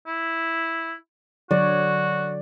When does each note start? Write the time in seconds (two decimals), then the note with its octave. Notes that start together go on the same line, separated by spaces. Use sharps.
0.07 E4
1.51 D3 F#3 F#4 C#5 D5